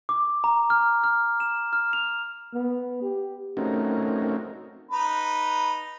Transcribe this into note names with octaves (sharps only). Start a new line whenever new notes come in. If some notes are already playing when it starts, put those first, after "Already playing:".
D6
A#5
F6
F6
E7
F6
F7
B3
G4
A3 C4 C#4 D#4 F#4 A#4
D#4 B4